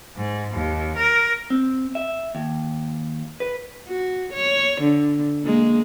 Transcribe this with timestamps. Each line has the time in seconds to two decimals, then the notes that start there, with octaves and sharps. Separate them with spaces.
0.17 G#2
0.52 D#2
0.97 A#4
1.50 C4
1.95 E5
2.35 D#2
3.40 B4
3.87 F#4
4.33 C#5
4.81 D3
5.42 G#3 A#3